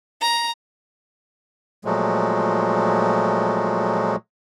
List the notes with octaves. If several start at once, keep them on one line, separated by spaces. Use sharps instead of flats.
A#5
A#2 F3 F#3 G#3 A3